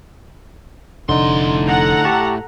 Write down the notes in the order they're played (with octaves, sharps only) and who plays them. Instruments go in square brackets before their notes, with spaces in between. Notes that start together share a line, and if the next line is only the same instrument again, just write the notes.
[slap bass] F1 [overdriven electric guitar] A2 C6 [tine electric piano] D3 D#4
[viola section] A4 F#5 A#5
[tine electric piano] G4 A5 C#6